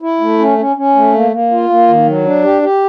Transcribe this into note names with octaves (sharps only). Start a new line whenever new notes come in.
E4
A3
C#4
C#4
C#4
A3
A#3
A#3
F4
A#3
D#3
F#3
D4
G4
G4